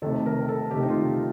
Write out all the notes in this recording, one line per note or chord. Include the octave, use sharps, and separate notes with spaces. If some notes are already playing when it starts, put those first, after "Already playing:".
C3 D#3 A3 A4
A#4
A4
C3 D#3 A3 G4
D#4
F4
G4